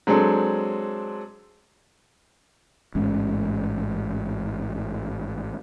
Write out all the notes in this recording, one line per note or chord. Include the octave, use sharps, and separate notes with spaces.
F#3 G#3 C4 D4 A4
A1 G#2 G#3 C#4